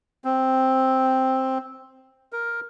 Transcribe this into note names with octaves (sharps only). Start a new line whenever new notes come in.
C4
A#4